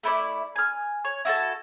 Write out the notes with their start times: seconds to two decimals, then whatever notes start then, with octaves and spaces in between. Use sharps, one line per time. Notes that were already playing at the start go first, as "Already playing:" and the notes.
0.03 A3 E4 C5 D5
0.56 G#5 F6
1.04 C#5
1.25 E4 F#4 A4 A5